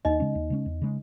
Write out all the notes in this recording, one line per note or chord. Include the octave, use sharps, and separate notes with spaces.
D#2 D#4 D#5
C#3 G#3 C#4
D#2
C#3 G#3 C#4
E2
C#3 G#3